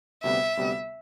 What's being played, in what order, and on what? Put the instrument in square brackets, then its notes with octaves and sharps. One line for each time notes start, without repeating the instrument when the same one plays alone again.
[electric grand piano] D2 C3 G3 B3 [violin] E5
[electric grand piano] D2 C3 G3 B3